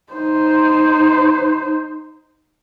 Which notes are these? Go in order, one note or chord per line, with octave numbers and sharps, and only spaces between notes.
D#4 C5